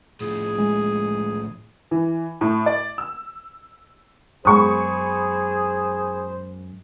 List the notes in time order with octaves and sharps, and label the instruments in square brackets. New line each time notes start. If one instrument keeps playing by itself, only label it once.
[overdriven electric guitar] A2 F3 [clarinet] G#4
[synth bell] G#3
[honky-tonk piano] E3
A2
D5
E6
[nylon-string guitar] F#2 G#3 B3 [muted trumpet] G#4 [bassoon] C5 [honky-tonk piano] B5 C#6 D#6